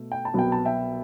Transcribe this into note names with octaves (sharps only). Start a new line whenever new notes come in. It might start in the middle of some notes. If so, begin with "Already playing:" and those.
Already playing: B2 A3
G5
A5
C2 B2 F#3 B3 G5
A5
E5 G5